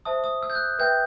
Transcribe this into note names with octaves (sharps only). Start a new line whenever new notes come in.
C5 E5 A5 D#6
D#6
E6
G6
F#6
B4 E5 G5 G6